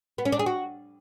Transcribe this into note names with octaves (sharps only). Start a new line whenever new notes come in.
B3
C#4
D4
G#4
F#4